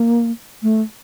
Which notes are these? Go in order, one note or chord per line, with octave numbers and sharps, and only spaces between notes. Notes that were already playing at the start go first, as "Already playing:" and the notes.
Already playing: A#3
A3